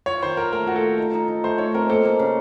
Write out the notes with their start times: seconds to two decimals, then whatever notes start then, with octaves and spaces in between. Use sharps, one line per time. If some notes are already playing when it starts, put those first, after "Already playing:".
0.06 F4 C#5
0.22 D#3 C5
0.37 F4 A#4
0.53 A3 A#4
0.67 F4 F#4
0.76 A4
0.83 D#3
0.98 D#4
1.14 D#4
1.28 D#4
1.44 A3 C5
1.58 D#4 C#5
1.74 C4 A#4
1.89 A#3 A4
2.05 A#3
2.19 C#3